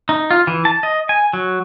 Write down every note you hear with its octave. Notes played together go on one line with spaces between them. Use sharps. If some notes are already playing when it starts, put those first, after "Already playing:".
D#4
F4
E3
A5
D#5
G#5
F#3